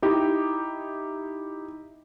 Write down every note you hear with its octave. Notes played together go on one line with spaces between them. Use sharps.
D#4 E4 G4